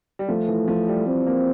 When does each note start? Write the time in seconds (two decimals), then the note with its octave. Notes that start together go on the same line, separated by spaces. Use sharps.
0.19 G3
0.29 F3 A3
0.48 E3
0.68 F3
0.88 G3
1.07 C4
1.27 A#3